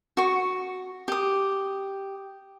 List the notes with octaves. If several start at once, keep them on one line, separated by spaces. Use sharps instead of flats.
F#4 C#6
G4 D#6